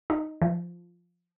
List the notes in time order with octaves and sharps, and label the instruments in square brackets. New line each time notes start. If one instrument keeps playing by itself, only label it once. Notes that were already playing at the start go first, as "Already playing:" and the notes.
[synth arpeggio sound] D#4
F3